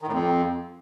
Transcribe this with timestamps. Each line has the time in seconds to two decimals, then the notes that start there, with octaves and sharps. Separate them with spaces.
0.02 D#3
0.07 A2
0.12 F2